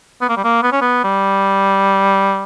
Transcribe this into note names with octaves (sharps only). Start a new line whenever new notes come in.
B3
A#3
G3
A#3
B3
C#4
B3
G3